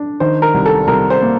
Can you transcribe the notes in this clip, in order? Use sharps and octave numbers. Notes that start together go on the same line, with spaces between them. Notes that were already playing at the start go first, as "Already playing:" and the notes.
Already playing: D4
D#3 C5
A#4
C2
A4
C2 A#4
C5
A#3